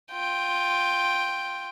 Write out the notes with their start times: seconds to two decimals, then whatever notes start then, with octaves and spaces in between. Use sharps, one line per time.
0.12 F4 G5